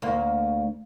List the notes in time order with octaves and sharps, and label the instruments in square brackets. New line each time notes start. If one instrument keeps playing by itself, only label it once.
[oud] D2 A#3